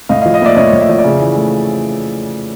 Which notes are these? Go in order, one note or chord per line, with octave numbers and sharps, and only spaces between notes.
A2 D#5 F5
D#5 F5
F3
D#5 F5
A#3 D5 E5
A2 C#5 D#5
A2
E5
F3 D#5
D5 E5
C#3
E3
A3